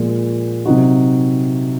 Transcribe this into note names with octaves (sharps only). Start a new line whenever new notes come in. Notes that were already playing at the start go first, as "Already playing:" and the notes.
Already playing: A#2 F3 G#3
C3 F#3 C4 D#4 F#4